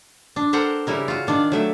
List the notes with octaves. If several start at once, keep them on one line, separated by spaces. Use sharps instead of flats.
D4
A4 A#4 C5 F#5 G5
C#3 G3 E4 A#4
F4 F#4
D#3 D4 F4 D5
F#3 A3 E5